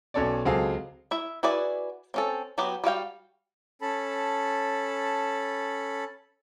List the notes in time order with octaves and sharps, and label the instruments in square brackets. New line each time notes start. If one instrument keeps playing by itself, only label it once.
[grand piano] B1 C#4 A4 C#5 D5
C#2 F#3 C4 G#4 A4 F5
[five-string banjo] E4 E5
E4 F#4 G#4 B4 D5
C4 C#4 A4
F#3 B3 F#4 G4
G3 F#4 F5 G5
[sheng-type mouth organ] C#4 A4 A5 B5